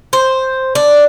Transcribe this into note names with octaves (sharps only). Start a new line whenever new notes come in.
C5
D4